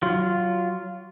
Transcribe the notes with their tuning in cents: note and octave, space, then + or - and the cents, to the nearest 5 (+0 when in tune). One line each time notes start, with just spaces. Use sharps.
F#3 +15 F4 -5